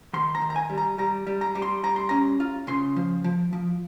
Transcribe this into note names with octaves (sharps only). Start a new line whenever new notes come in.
D#3 C6
A#5
D#3
A#5
G#5
G3
A#5
G3 A#5
G3
A#5
G3
C6
G3 A#5
C6
C#4 A#5
F4
C#3 C6
F3
F3
F3